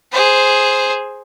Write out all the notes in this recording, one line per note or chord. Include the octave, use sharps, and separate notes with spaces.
G#4 C5